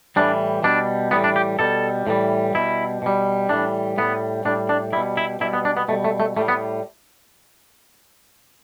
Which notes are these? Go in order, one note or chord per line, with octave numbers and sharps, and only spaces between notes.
A2 E3 G3 D4
B2 G3 D4
A2 E3 G3 B3
D4
G4
B2 G3 A4
A2 E3 G3
B2 G3 E4
B2 G3
A2 E3 G3 D4
A2 G3 B3
A2 G3 D4
D4
B2 G3 E4
E4
B2 G3 E4
B3
D4
B3
B2 G3 A3
A3
A3
A2 G3 A3
B3